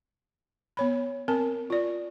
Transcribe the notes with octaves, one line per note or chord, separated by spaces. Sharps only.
B3 C#5 B5
C4 A#4 A5
F4 D5